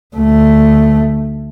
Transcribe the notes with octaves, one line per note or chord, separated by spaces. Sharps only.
D2 A3